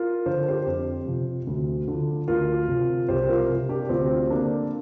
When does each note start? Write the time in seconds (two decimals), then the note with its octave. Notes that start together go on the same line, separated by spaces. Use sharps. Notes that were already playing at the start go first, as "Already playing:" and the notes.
Already playing: F4 A#4
0.26 D3 F3 C5
0.48 G4 C5
0.66 F2
1.06 C3 F3
1.47 D2
1.88 D3 F3
2.28 D2 F4 A#4
2.68 C3 F3
3.08 C2 G4 C5
3.29 F4 A#4
3.49 C3 F3
3.69 D4 G4
3.89 D2 C4 F4
4.30 D3 F3 A#3 D4